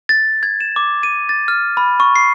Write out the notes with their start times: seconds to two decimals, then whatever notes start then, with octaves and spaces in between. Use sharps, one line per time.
0.09 A6
0.43 G#6
0.61 E7
0.76 D6
1.03 D#7
1.29 A6
1.48 F6
1.77 B5
2.00 C#6
2.16 C7